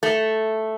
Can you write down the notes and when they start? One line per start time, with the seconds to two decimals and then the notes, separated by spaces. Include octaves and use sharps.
0.03 A3